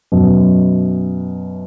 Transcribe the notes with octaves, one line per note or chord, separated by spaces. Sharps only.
F#2 B2